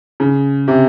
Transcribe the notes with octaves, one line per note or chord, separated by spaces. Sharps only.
C#3
C3